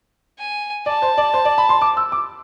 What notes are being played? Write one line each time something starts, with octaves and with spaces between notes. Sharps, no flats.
G#5
D5 A5
C5
D5
C5
D5
B5
C6
D6
E6
D6